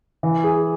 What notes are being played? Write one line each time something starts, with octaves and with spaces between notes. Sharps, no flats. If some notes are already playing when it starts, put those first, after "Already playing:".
E3
G#4